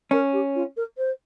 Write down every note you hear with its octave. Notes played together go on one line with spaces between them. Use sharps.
C#4 A#4
G4
F4
A#4
C5